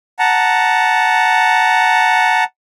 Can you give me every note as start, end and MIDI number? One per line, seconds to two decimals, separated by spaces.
0.19 2.44 78
0.19 2.44 81
0.19 2.44 82